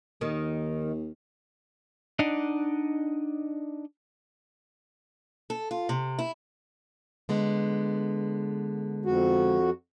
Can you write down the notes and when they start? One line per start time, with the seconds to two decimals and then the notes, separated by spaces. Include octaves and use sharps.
0.21 D#2 D#3
2.19 D4 D#4 D5 D#5 F#5
5.50 A4
5.71 F4
5.89 C3
6.19 E4
7.29 D3 G#3 B3
9.06 F2 F#4